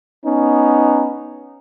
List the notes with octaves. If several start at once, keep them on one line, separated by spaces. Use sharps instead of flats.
B3 C#4 D#4